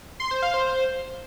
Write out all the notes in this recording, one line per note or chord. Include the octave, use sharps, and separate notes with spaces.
C6
C5
F5
C5